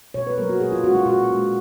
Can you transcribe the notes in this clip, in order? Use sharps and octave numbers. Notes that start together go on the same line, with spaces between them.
B2 C#5
B4
F#3 A#3 A#4
F#4
A#2 G#4
F4
G#3 C#4 F#4
F4
A#2 F#4
G#3 C#4